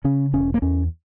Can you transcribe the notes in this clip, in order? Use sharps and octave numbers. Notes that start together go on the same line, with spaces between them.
C#3 C#4
E1 C#4
A#3
E2 C#4